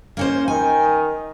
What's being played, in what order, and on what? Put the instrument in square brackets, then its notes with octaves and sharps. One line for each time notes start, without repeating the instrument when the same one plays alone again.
[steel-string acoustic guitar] A#3 C#4 C5
[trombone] D#3 [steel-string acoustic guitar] G#5